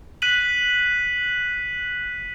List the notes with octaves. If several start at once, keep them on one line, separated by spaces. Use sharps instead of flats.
F#6 B6 D#7 F#7